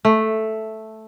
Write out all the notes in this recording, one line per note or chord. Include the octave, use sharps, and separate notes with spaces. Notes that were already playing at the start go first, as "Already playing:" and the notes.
A3